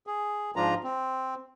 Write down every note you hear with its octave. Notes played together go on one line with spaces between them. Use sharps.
G#4
G#2 F3 D4 F4 A#5
C4